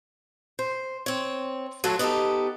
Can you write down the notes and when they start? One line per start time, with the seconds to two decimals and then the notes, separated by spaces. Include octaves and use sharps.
0.59 C5
1.06 C4 C#5
1.84 F#3 A3 F4 F#4 A4 C#5
1.99 B3 D#4 F#4 G4 A4